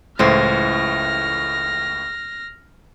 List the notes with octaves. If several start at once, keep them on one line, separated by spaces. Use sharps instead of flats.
C#2 A2 E3 E4 C5 F6 A#6